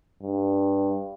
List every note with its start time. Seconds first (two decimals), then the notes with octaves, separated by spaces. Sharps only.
0.22 G2